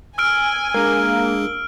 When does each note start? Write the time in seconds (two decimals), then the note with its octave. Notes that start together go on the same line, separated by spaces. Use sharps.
0.18 G#5 E6 F6 D7
0.74 G#3 A#3 D4 G#4